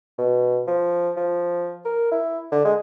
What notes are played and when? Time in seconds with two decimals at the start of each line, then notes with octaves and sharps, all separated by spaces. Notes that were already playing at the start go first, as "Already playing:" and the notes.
0.18 B2
0.68 F3
1.17 F3
1.85 A#4
2.11 E4
2.52 D3
2.65 G#3